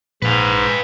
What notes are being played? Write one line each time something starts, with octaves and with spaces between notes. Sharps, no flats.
A#1 G#2 B4 F5